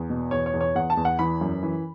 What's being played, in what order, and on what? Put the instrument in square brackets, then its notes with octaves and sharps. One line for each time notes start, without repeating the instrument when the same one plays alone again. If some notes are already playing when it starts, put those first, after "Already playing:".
Already playing: [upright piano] E2
B2
E2 C#5
C#5
E2
C#5
E2 F#5
A5
E2
F#5
E3 B5
F#2
E3